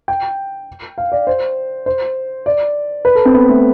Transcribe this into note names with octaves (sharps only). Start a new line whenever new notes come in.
G5
F5
D5
C5
C5
D5
B4
A4
C4
B3
A3